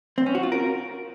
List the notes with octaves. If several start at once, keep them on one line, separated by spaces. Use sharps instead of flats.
C4
C#4
F#4
F4
A#4